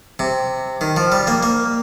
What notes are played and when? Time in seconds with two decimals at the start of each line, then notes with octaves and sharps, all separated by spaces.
0.19 C3
0.81 D#3
0.96 F3
1.12 G3
1.27 A#3
1.43 A#3